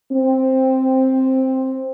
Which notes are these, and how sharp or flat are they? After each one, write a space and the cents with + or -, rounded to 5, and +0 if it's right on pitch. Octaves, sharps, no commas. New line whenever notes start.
C4 +5